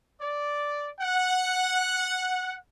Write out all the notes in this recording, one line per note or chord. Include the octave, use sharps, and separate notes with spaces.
D5
F#5